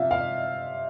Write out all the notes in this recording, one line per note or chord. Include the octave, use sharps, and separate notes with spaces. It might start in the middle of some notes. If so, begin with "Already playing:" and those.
Already playing: C3 F3 F4 E5
F5